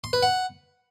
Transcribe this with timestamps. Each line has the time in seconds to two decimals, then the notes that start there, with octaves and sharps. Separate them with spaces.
0.04 C6
0.13 B4
0.23 F#5